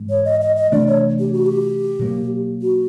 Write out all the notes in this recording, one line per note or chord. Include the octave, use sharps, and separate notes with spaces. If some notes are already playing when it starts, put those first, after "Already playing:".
Already playing: G#2 E3 G#3
C#5
D#5
D#5
D#5
C3 E3 A3 D4 D5
C#5
G4
F#4
G4
B2 F#3 A#3
F#4